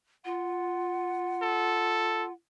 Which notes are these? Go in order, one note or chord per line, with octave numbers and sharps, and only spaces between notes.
F4 F#5
A4